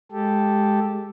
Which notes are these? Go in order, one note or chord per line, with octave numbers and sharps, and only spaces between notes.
G#3 G4 A4